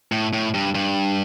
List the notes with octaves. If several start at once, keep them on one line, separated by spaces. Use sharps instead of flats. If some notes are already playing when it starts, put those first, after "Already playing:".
A2
A2
G2
G2